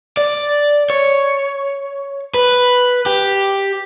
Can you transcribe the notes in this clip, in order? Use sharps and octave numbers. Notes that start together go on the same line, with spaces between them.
D5
C#5
B4
G4